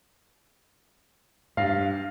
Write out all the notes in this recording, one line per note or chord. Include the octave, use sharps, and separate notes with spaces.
G2 F5